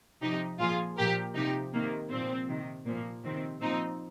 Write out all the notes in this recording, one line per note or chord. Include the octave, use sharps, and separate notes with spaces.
C3 F3 D#4 G4
A#2 F3 F4 G#4
A#2 F3 G4 A#4
C3 F3 D#4 G4
C3 D#3 A#3
A#2 F3 C4
C3 D#3
A#2 F3 A#3
C3 D#3 C4
A#2 F3 C4 D#4